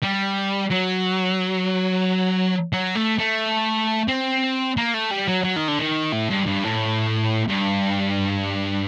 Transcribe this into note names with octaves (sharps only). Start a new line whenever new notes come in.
G3
F#3
F#3
A3
A3
C4
A#3
A3
G3
F#3
F#3
D#3
D3
D#3
A2
G2
G2
A2
G2